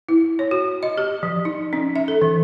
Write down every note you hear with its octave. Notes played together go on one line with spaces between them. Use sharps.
E4
C#5
F#4
D#5
G4
F3
D#4
C#4
E5
A4
E3